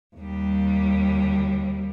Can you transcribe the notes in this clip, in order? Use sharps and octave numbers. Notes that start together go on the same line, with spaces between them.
D#2 G3